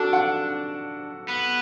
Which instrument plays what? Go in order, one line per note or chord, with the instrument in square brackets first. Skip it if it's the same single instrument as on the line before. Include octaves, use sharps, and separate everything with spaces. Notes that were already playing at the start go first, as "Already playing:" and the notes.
Already playing: [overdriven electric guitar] D4 [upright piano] F#4 A4
[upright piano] F#5
[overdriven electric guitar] B3